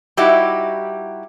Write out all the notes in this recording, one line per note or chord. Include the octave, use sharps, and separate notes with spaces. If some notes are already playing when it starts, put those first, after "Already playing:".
G3 D#4 E4 F#4 G4